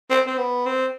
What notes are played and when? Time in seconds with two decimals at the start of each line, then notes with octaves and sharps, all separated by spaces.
0.10 C4
0.27 C4
0.38 B3
0.66 C4